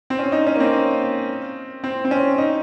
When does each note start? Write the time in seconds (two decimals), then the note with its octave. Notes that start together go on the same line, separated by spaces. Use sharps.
0.10 C4
0.19 C#4
0.32 D#4
0.47 C#4
0.56 A#3
0.60 C4
1.84 C4
2.05 C4
2.11 C#4
2.38 D#4